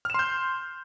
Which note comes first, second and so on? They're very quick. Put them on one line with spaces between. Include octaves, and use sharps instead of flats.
F6 E7 C6 G6